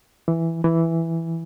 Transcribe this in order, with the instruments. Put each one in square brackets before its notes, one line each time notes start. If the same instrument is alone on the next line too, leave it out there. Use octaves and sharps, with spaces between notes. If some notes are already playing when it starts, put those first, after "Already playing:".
[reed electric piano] E3
E3